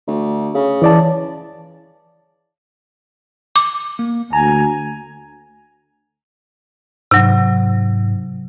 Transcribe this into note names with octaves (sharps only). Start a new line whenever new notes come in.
D2
C#3
E3 D5 A5
D6
A#3
D2 G#5 A#5
G#2 C3 F#3